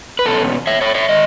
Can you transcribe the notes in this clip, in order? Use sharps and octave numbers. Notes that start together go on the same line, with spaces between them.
B4
E2 B2 C#4 A4
C#5 E5
C#5 E5
C#5 E5
D#3 G#3 D#5